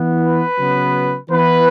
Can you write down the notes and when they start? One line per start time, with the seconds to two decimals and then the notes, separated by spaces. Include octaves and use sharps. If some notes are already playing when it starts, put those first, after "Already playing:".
Already playing: E3 B3
0.21 B4
0.58 C#3 F#3 B3
1.30 E3 B3 B4